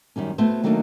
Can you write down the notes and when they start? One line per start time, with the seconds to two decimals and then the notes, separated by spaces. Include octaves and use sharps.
0.16 F#2 D#3 G3 C#4
0.38 A3 B3 E4 F#4 C5
0.63 D#3 F#3 A3 A#3 D4 D#4